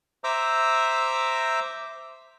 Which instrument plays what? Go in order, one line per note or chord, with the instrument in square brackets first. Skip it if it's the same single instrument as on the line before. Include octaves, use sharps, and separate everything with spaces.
[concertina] C5 E5 A#5 D6 E6